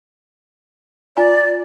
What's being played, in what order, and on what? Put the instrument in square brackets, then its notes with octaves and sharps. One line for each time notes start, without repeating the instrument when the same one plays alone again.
[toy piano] F4 G#5 A#5 [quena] D5